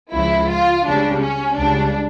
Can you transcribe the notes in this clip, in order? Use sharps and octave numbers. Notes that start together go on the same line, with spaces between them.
C#2 C#3 F3 E4
F4
C#2 C#3 G3 D4
C#4
C#2 C#3 G3 D4